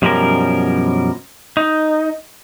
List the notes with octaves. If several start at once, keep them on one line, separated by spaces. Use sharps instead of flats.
F#2 B2 F3 G3 C#4 A#4
D#4